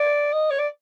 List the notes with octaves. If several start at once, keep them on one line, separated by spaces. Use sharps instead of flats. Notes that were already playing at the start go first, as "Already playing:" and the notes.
Already playing: D5
D#5
C#5
D5